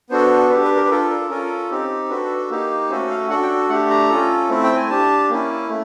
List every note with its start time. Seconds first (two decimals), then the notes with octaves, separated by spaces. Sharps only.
0.10 B3 D4 F#4 A4 C5
0.50 D4 G4 B4
0.64 B4
0.77 A#4
0.86 B4
0.90 D4 F4 A4 A#4
1.10 A#4
1.30 C#4 F4 A4 A#4
1.71 C4 D#4 G4
2.09 D4 F#4 A4 B4
2.50 A#3 D#4 G4
2.90 A3 C#4 F#4 A4 C5
3.10 F5
3.30 D4 F#4 A4 F#5
3.43 G5
3.69 A3 D4 G4 F#5
3.90 A#5
4.09 C#4 F4 A4
4.49 A3 C4 E4
4.63 G5
4.76 G#5
4.90 D4 G4 A5
5.30 A#3 C#4 E4
5.69 A3